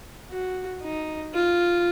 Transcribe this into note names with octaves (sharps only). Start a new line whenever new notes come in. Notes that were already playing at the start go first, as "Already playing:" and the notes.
F#4
D#4
F4